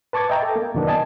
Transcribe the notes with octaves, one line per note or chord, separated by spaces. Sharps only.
B4 A5 C#6 D6 G#6 A6
D#5 E5 G5 A#5
A4
A#3
F#2 C3 D#3 B3 D4
D#5 G#5 A5